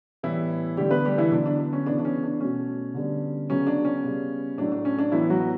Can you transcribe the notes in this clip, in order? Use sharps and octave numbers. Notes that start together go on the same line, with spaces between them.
A2 E3 G3 B3 E4
D3 G3 A3 G4
B3 B4
G3 G4
E3 E4
D3 F#3 B3 D4
D4
D4
C#4
C#3 E3 B3 D4
D4
C#4
D4
B2 A3 C#4
D3 G3 B3
C#3 F#3 B3 C#4
D4
C#4
C#3 G3 B3
A2 F#3 A3 D4
D4
C#4
D4
A2 E3 F#3 B3 E4
F#3 F#4